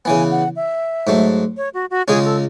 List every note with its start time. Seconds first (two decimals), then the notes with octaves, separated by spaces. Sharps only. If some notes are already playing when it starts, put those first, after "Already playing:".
0.05 C#3 E3 B3 G#5
0.31 F#5
0.56 E5
1.07 G#2 F#3 A3
1.57 C#5
1.74 F#4
1.90 F#4
2.08 C#2 C#3 G#3 C#4 G#4
2.25 A4